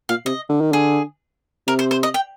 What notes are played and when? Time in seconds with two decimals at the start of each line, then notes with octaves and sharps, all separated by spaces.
0.09 A#2 F5
0.25 C3 D#5
0.49 D3
0.61 D#3
0.72 D3 G#4
1.67 C3 A#4
1.79 C5
1.91 C5
2.03 D#5
2.14 G5